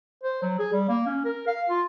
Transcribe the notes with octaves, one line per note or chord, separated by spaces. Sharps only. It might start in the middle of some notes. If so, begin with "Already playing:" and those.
C5
F#3
G#4
G3
A#3
C#4
A#4
F5
F4